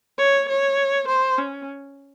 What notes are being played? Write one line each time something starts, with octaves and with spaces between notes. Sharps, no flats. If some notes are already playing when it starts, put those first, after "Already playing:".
C#5
C#5
C5
C#4